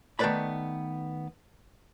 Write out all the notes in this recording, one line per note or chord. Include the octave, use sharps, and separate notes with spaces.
D#3 A3 B3 B4 D5 B5